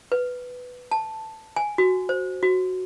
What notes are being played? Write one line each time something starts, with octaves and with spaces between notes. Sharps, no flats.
B4
A5
G#5
F#4
C5
F#4